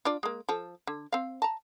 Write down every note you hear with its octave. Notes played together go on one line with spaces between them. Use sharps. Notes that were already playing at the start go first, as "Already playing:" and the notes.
D4 F4 D5
G#3 A#3
F3 A4
D3
C4 F5
A5 A#5